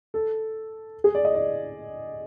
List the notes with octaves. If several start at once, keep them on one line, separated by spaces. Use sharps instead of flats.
A4
G#4
D5
D#5
D5